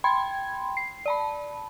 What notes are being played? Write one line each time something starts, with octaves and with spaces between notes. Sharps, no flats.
G5 B5 C6 G#6
C7
D5 A5 B5